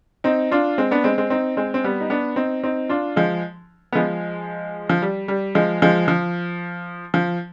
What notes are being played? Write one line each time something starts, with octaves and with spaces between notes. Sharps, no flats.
C4 D#4
D4 F4
G#3 C4
B3 D4
G#3 C4
G#3 C4
C4 D#4
G#3 C4
C4
G3 B3
D#4
B3 D4
C4 D#4
C4 D#4
D4 F4
F3 G#3
B3
F3 G#3
F3
G3
G3
F3 G#3
F3 G#3
F3
F3